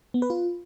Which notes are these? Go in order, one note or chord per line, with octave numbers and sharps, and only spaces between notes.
B3
B4
F4